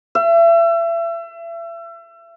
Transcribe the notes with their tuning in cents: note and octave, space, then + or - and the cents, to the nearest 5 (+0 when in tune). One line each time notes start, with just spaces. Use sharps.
E5 +35